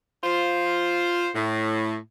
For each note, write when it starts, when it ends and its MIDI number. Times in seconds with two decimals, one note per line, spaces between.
0.24 1.29 65
0.24 1.29 72
1.35 1.95 45